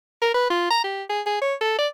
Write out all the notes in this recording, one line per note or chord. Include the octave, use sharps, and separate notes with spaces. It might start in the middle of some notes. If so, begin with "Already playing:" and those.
A#4
B4
F4
A#5
G4
G#4
G#4
C#5
A4
D5